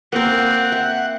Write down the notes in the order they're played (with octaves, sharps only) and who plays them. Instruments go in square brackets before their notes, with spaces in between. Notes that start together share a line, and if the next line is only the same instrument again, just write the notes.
[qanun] A#3 A#4 [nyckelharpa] C4 [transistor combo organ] F#5
[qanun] E5